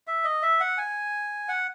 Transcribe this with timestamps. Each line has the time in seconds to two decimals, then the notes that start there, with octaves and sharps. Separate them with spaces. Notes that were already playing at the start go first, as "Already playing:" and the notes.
0.07 E5
0.25 D#5
0.43 E5
0.60 F#5
0.78 G#5
1.48 F#5